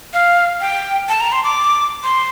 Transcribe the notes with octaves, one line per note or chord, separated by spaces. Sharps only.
F5
G5
A5
A#5
C6
D6
C6